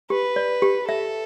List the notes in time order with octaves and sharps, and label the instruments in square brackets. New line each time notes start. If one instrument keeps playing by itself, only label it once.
[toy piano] G4 [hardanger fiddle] B4
[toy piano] D5
G4
[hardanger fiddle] A4 [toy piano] E5